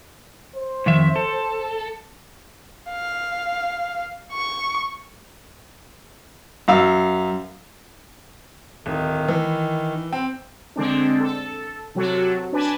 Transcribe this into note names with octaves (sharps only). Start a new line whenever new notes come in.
C5
F2 D#3 E5
A4
F5
C#6
F#2 F5 E6
D1 D#3
E3
C4 G5
D3 G#3 C4 D4
A4
C3 F#3 F#4 A4
D4 B4 G#5 A5